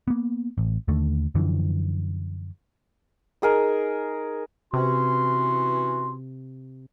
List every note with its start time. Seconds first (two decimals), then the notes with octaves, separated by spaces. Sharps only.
0.08 A#3 B3
0.58 A1
0.88 D#2 D3 A3
1.35 F#2 D3 E3 F3
3.42 D#4 G#4 A#4
4.73 C3 E3 C#4 F#4 C6